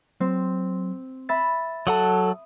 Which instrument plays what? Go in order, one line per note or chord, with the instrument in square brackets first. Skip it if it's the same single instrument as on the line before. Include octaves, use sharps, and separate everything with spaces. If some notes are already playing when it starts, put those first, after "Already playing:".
[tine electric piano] F#3 [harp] C4
[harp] E5 B5 [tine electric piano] A6
[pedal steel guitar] F#3 F#5 A5 [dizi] A4 [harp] D#6 [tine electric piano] E6